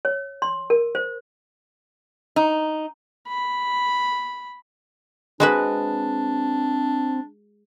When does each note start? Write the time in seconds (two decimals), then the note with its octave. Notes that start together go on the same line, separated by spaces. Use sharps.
0.05 C#5
0.42 C6
0.70 A#4
0.95 C5
2.36 D#4
3.28 B5
5.40 G#3 C4 D4 F#4 B4